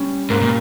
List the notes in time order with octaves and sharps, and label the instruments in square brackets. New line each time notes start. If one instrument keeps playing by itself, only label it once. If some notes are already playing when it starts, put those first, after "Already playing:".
Already playing: [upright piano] G3 C#4
[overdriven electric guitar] G#2 [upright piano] A#3
[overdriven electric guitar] A#2